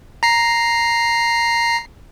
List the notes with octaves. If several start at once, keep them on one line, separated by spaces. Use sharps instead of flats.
A#5 C7